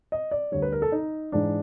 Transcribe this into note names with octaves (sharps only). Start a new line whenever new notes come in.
D#5
D5
D2 D3 G3 C#5
B4
A#4
A4
D#4
G#2 E3 G#3 D4